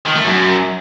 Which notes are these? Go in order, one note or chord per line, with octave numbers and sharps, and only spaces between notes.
D#3
A3
F#2